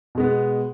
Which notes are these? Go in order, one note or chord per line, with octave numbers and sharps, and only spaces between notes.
B2 G#3 B3